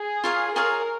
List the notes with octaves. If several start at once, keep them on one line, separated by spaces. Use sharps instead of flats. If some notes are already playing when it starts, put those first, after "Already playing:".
Already playing: G#4
F4 A#4 C#5 F5
F4 G#4 A#4 C#5 F5